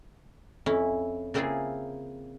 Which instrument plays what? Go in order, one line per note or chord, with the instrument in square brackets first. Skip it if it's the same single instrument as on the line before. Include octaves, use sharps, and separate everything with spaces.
[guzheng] F2 C#4 E4
C#3 A#3 C4 E4 F4 G#4